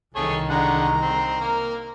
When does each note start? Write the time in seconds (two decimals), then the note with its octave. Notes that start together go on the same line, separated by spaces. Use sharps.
0.16 C2 D#3 G#4 A4 C#5
0.50 D3 G#3 F#5 A#5
1.01 C4
1.41 A#3 A#4